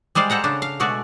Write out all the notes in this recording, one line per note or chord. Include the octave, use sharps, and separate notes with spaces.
G3 G#3 C5 D5 F5
A4 C5 F#5 A#5
C#3 D4
F5
B2 G#3 A3 F#4 D5